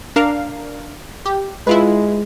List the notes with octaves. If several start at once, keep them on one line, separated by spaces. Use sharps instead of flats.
D4 A#4 F5
G4
G#3 E4 F4 B4